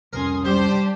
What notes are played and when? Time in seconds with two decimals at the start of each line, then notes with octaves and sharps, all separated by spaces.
0.13 C2 F2 C#4 A#4 G#5 C6 D#6
0.45 G3 D4 G4 C5